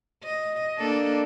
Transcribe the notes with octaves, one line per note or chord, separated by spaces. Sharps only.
D#5
A#3 D4 A4